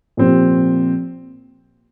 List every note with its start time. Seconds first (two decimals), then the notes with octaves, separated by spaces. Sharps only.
0.17 A#2 F3 C4 G4